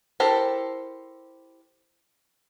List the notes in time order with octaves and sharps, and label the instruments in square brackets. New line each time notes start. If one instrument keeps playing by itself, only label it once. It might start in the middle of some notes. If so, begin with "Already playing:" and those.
[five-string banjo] E4 G4 A4 A#4 C5